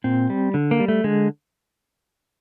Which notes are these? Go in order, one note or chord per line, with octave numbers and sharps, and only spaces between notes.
A#2 C4
G3
D3
A#3
G3
A3
D3 G#3